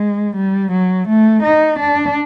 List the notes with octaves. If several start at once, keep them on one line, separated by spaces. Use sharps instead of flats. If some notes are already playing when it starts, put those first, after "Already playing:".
Already playing: G#3
G3
F#3
A3
D#4
D4